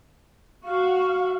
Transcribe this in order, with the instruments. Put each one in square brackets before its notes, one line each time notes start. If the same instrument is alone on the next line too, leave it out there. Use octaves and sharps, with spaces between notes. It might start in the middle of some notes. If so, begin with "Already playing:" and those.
[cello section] F#4 [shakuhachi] F5